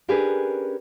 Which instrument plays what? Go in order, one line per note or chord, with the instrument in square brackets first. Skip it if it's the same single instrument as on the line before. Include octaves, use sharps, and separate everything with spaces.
[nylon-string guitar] C#4 D4 G4 G#4 A#4 B4